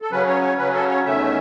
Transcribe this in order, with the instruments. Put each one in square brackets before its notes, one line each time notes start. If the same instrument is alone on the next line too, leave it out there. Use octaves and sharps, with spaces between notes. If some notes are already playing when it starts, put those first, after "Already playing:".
[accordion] A4
C#3 F#3 C#4 B4
C#5
C#5
C#3 F#3 C#4 B4
A4
C#5
E2 D#3 A3 C#4 E5